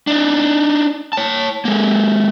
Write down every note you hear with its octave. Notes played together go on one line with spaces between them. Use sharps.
D4 D#4
C#5 A5
G#3 A#3